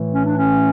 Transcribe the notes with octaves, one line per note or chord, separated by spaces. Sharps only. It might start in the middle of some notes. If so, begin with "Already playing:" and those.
Already playing: A2 E3 A3
C#4
D4
C#4